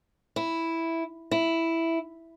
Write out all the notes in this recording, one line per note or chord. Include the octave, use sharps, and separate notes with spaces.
E4
E4